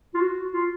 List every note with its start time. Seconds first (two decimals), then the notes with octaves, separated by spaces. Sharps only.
0.14 F4
0.20 F#4
0.53 F4